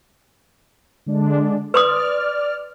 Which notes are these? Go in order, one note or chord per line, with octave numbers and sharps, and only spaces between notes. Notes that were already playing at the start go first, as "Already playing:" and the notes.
D3 G#3 D4
B4 D5 C6 D#6 F6